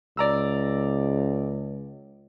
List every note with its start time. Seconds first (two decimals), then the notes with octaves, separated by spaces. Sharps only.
0.17 C#2 D5 A#5 E6